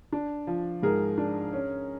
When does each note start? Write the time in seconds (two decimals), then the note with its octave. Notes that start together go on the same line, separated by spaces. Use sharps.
0.12 D4
0.47 F3
0.83 G#2 G#4 A#4
1.18 D4
1.53 C#4